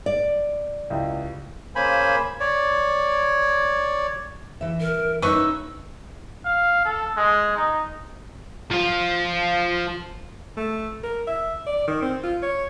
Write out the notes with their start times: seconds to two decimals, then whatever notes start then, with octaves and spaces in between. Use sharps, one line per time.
0.06 D5
0.90 C#2 E4 G4
1.76 C#3 A#3 C5 G#5 B5
2.40 C#5 D5
4.61 E3 E5
4.80 A#4
5.22 C#4 D#4 E4 B4 C#6 E6
6.45 F5
6.85 A4
7.17 G#3
7.57 D#4
8.71 F3 F4
10.57 A3
11.03 A#4
11.27 E5
11.67 D5
11.87 D#3
12.02 C4
12.23 F4
12.42 C#5